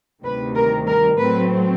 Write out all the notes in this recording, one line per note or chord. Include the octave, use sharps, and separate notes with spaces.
D2 C3 D#3 G3 B4
A#4
A#4
A2 F#3 A3 C4 B4